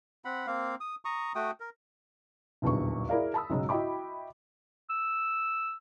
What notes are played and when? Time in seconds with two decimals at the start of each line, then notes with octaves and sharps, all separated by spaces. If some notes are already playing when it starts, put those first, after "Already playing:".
0.25 C4 F#5 B5
0.47 A#3 C4 F5
0.80 D#6
1.05 A#5 C#6 D#6
1.35 A3 F#4 G5 D#6
1.60 A#4
2.62 D#1 B1 E2 D3 C#6
3.09 E4 G#4 A#4 D5 F5
3.34 A5 B5 D#6 E6
3.50 B1 G#2 C#3 F#3 G#3
3.69 E4 F#4 D#5 G5 B5 D6
4.90 E6